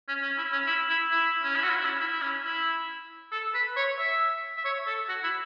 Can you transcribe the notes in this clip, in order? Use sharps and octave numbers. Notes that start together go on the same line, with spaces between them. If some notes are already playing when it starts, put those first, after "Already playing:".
C#4
C#4
E4
C#4
E4
E4
E4
C#4
E4
F#4
E4
E4
C#4
E4
E4
C#4
E4
A4
B4
C#5
E5
E5
C#5
A4
F#4
E4